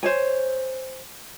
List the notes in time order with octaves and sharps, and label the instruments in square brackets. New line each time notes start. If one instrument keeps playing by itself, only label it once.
[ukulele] C5 C#5 G#5